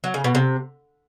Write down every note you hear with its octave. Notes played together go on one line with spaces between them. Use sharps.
F#3
C#3
B2
C3